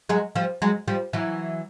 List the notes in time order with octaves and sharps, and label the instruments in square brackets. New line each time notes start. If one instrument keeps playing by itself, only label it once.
[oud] F#3 G#3
F3 G3
F#3 G#3
F3 G3
E3 F#3